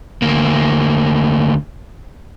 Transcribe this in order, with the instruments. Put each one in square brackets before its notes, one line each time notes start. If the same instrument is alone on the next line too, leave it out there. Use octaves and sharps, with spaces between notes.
[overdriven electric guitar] D2 A#3